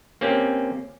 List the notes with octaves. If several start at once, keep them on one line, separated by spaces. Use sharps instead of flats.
A#3 C4 C#4 G4